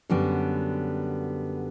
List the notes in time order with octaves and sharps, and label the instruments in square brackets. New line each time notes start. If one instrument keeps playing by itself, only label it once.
[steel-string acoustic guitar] F#2 D3 G3 B3